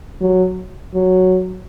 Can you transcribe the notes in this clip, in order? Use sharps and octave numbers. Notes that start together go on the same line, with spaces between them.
F#3
F#3